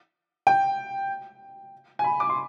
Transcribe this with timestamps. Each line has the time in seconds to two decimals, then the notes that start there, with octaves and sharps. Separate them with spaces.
0.47 G5
1.99 G#5
2.04 B5
2.20 D6
2.29 C6